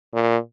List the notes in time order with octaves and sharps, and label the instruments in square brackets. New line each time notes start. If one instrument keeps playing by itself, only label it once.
[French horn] A#2